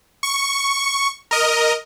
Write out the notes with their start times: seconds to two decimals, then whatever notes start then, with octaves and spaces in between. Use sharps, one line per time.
0.23 C#6
1.31 A#4 D#5